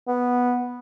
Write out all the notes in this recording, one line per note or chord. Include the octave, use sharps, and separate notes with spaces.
B3